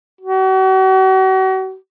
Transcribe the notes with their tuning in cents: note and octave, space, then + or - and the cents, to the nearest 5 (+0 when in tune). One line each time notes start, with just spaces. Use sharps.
F#4 +40